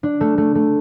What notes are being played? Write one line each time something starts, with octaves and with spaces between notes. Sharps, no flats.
D4
A3
A3
A3